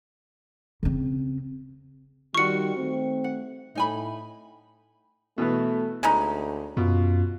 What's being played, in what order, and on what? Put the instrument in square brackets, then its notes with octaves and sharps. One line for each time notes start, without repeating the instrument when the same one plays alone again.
[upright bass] C#3 C4
[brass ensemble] D#3 G3 [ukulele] F4 F#4 [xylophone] C#6 C#7
[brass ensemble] D#3 A3 C4
[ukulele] F#5
[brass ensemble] A2 [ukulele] D#4 G#5 B5
[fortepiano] B2 E3 B3 [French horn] A3
[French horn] D2 [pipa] G#3 C#4 D#4 [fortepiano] B5
[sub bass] F#2 [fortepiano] B2 [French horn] F4